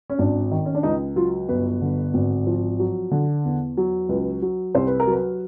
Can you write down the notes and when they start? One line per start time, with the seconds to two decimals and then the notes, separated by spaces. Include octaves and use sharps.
0.10 C#4
0.19 G#1 D4
0.51 D#3
0.65 C#4
0.75 D4
0.83 C#2 D#4
1.16 F#3 F4
1.49 G1 B4
1.82 D3
2.14 G#1
2.47 F3
2.79 F#3
3.11 D3
3.45 E2
3.77 F#3
4.09 C#2 B4
4.42 F#3
4.75 C2 C5
4.87 B4
5.00 A#4
5.07 F#3 B4